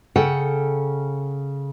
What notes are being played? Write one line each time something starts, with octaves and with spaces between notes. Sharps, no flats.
C#3 A4 F#5 G5